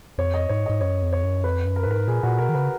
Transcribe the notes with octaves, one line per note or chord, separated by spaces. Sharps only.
F2 C#5
D#5
G#2 C#5
G#2 D#5
F#2 C#5
F2
C#5
F#2
F2 B4
F#2
A#4
B4
G#2 A#4
A#2 G#4
A#2 F#4
B2 A#4
D#3
C#3 B4